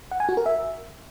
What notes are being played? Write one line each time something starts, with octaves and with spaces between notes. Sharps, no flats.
F#5
G#5
F#4
A#4
E5